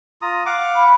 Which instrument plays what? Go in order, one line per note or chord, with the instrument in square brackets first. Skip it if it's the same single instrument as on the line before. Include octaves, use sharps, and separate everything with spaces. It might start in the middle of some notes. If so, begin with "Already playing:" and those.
[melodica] F4 A#5 D#6
F5 F#5 D6
[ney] B5